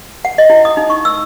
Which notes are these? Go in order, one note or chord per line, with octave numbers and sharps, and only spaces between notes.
F#5
D#5
E4
D#6
D#4
C#6
E6